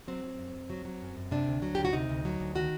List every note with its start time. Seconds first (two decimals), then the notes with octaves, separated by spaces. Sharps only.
0.08 F#3 C4
0.24 F#3
0.39 F#2
0.54 F#2
0.70 F#3
0.85 F#3
1.01 F#2
1.17 F#2
1.31 C3 D4
1.48 D2
1.62 F#3
1.75 D2 G4
1.85 F#4
1.93 C3 D#4
2.09 D2
2.25 F#3
2.40 D2
2.55 D#3 F#4